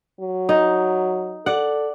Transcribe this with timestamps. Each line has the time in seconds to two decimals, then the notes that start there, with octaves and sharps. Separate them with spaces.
0.20 F#3
0.49 D#4
1.46 A4 D5 F#5